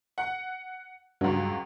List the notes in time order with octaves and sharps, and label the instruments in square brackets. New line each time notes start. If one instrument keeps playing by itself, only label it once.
[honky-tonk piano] F#5
[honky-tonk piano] C#2 F#3 [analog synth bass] G2